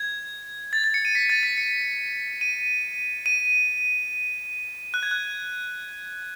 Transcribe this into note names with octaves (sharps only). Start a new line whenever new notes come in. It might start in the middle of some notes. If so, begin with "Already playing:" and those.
Already playing: G#6
A6
A6
C#7
D#7
B6
A6
B6
C#7
D#7
D#7
F#6
G#6
F#6